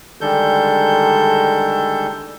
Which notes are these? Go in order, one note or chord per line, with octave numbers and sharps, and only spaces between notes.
D3 D#3 G3 G#3 A4 G6